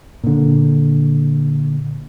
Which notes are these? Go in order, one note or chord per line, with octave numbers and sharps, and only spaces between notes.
A#2 D3